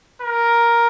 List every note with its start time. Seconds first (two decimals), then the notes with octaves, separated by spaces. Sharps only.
0.22 A#4